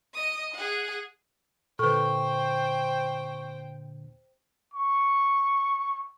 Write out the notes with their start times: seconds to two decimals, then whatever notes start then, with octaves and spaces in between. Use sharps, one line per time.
0.15 D#5 D#6
0.55 G#4 F#5
1.79 A#2 D3 A4 B4 C5 G5 C#6
4.74 C#6